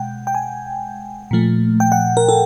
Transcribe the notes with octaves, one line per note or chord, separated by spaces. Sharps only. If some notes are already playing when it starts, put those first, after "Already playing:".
Already playing: B2 G#3 F#5 G5
G5
G#5
A#2 F3 A3
G5
F#5
A#4
A4